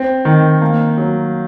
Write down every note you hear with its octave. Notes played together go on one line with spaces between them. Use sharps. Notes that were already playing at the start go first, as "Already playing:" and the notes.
Already playing: C4
D#3
A#3
F#3